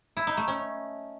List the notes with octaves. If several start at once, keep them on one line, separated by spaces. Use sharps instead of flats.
E4
D#4
A3
C#4